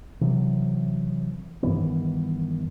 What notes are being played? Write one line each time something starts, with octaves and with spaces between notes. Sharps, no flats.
C3 E3 F#3
G2 D#3 E3 B3